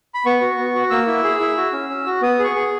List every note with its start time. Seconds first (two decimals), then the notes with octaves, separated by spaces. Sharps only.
0.14 B5
0.26 B3 C#6
0.41 F#4
0.58 B3
0.75 F#4
0.90 A#3 E6
1.07 E4
1.24 G#4
1.40 E4
1.57 F#4
1.72 C#4
1.90 C#4
2.06 F#4
2.22 B3 D#6
2.39 G#4 C#6
2.56 G#4